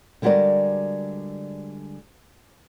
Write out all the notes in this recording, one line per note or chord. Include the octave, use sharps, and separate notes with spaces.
D3 G3 G#3 F#4 A#4 D5